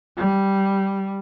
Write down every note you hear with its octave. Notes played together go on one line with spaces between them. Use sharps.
G3